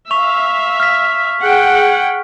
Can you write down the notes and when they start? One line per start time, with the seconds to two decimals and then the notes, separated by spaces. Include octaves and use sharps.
0.11 E5 F5 C#6 F7
0.80 F6 B6
1.41 G#4 F#5 G5